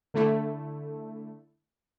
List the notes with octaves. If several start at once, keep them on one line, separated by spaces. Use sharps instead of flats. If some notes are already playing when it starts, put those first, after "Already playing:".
D3 A3 E4